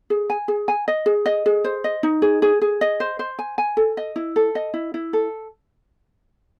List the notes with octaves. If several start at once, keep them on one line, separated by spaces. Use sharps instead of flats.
G#4
G#5
G#4
G#5
D#5
G#4
D#5
G#4
C5
D#5
D#4
G#4
G#4
G#4
D#5
C5
C5
G#5
G#5
A4
D#5
E4
A4
D#5
E4
E4
A4